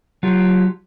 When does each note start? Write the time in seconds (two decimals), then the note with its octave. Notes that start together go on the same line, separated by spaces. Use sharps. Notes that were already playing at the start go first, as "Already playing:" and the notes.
0.23 F#3 F4 G4